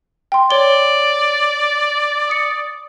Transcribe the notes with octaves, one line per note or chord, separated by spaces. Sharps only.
G5 C6
C#5 D5 G7
D#6 C#7